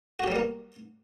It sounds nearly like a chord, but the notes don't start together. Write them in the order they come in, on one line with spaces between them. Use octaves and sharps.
F#4 G4 F#3 G3 A#3